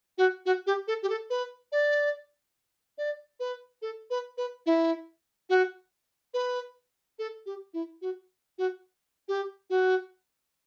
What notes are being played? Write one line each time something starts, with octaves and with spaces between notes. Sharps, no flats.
F#4
F#4
G4
A4
G4
A4
B4
D5
D5
B4
A4
B4
B4
E4
F#4
B4
A4
G4
E4
F#4
F#4
G4
F#4